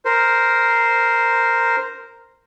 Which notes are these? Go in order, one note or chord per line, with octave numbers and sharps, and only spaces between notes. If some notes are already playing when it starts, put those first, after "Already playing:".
A#4 C5